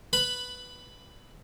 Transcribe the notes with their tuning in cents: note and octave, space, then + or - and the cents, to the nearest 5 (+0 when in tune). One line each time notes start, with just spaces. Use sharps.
B4 +5 B5 +0